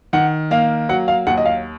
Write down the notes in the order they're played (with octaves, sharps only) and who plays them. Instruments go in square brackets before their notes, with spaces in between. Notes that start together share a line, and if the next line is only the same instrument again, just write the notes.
[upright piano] D#3 [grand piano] F#5
[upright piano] A#3 [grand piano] F5
[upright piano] F#3 [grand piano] F#5
[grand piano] F5
[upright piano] D#2 [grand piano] F#5
[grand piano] D#5
F5